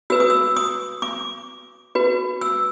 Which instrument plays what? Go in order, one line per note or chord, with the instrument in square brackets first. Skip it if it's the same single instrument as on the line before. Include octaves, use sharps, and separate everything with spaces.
[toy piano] F#4 B4 E6
D#6
E6
D#6
D6
F#4 B4
E6